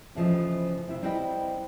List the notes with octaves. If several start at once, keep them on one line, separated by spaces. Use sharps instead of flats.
A2 C#3 E3 F3 C5 D#5
C3 E4 E5
G3 C4 E4 B4 D#5 G5